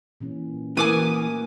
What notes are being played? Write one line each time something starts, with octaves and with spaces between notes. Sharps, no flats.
A#2 E3 C#4
E3 A3 A#3 A#4 G#5 D6 D#6
F#4